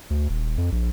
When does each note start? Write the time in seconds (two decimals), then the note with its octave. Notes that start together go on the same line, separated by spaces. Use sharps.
0.10 D2
0.30 D#1
0.58 F2
0.72 A#1